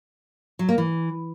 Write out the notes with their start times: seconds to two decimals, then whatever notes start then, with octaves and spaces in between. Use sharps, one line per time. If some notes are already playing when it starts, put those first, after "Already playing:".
0.59 F#3
0.69 A#3
0.78 E3